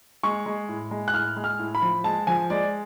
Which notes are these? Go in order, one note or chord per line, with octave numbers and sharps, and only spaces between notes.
G#3 C#6
G#3
A2
G#3
F#6
A2 F6
G#3
F6
A2
B5
F3
G#3 A5
F3 G#5
G#3 D5